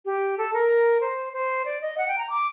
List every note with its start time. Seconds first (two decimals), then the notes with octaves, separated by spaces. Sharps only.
0.05 G4
0.38 A4
0.53 A#4
1.01 C5
1.33 C5
1.65 D5
1.81 D#5
1.98 F#5
2.08 G5
2.18 A#5
2.30 D6